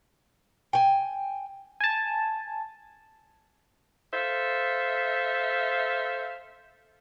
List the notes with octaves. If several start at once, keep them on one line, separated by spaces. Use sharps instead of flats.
G5 G#5
G#5 A5
A4 C5 E5 F5